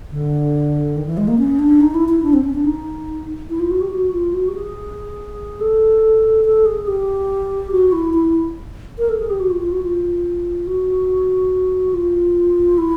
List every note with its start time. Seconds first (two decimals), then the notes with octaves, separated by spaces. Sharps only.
0.12 D3
0.96 D#3
1.07 E3
1.17 G#3
1.28 A#3
1.38 C#4
1.59 D4
1.81 D#4
1.94 E4
2.09 E4
2.23 D4
2.33 C4
2.44 C#4
2.54 D4
2.65 D#4
3.50 E4
3.60 F4
3.71 F#4
3.81 G4
3.92 F#4
4.13 F4
4.34 F#4
4.48 G4
4.55 G#4
5.61 A4
6.45 A4
6.66 G#4
6.87 G4
7.71 F#4
7.92 E4
8.14 E4
8.98 A#4
9.09 A4
9.19 G#4
9.30 G4
9.40 F#4
9.51 F4
9.61 F4
9.72 F#4
9.83 F4
10.67 F#4
11.94 F4
12.78 E4